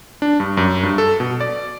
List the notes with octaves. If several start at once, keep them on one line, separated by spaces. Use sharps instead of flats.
D4
G2
F#2
G2
A4
B2
D5